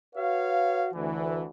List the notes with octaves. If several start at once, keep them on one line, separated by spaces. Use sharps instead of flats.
F#4 B4 C#5 F5
D2 E3